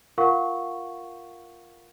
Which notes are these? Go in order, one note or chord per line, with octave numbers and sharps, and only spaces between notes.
F4 A#4 F5 F#5 C#6